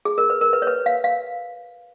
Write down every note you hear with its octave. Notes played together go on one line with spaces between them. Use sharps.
G#4
A#4
B4
A#4
B4
C#5
B4
F5
F5